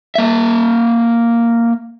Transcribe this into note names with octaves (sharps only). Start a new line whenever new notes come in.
A#3 E5